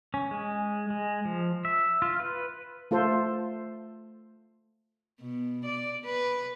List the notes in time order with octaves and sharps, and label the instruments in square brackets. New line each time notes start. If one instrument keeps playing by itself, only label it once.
[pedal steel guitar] C#4
G#3
G#3
F3
E5
F4
B4
[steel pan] A3 F4 A4 C5
[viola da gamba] B2
D5
B4